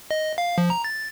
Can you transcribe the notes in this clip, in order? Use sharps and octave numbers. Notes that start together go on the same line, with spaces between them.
D#5
F5
F3
A#5
A6